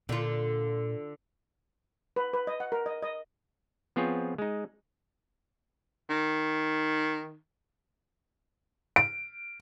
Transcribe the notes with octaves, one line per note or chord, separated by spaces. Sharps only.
A#2 D3 F4
B4
B4
D#5
F#5
A#4
D#5
D#5
F3 B3 C4 F4 G#4 C#5
G#3 D#4
D#3
D7